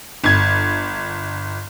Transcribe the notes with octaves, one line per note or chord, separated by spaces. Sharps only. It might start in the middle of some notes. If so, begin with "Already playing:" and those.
G1 G#6